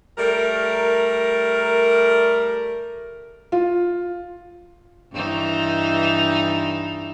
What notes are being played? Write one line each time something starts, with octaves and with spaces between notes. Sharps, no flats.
G3 A3 A#4
F4
G2 E3 D#4